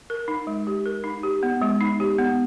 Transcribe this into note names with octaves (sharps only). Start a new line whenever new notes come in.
A#4
D#4
G#3
G4
A#4
D#4
G4
B3
G#3
D#4
G4
B3